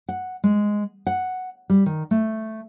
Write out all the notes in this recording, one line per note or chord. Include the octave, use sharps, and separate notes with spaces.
F#5
G#3
F#5
G3
D#3
A3